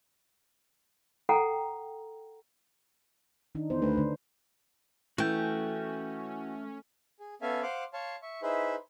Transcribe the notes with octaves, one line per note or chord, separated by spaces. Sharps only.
A4 F#5 G5 A#5
D#3 D4 D#4
E2 C5
D2 B4
D3 A3 D4
E3 A3 C#4 F#4 G5 G6
G#4
B3 C#4 A4 E5 F5 G#5
C5 F5 F#5 C6 D6
C#5 F5 A5 C6 C#6
E5 C#6
D#4 E4 G#4 B4 C5 E5